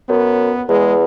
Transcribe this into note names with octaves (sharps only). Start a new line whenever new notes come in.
F#2 B3
E2 G#3